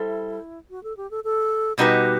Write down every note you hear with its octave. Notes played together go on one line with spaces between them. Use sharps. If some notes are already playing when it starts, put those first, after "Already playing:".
Already playing: G3 E4 A4 C5
F#4
A4
G4
A4
A4
B2 G3 D#4 F#4 G4 B4